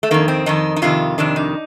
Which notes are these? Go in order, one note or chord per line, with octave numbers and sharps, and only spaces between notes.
A3
F2 D#3 A#3
C4
F2 D#3 D#4
D#4
F2 C3 D#3 F4
F2 C3 D#3 D4
D#4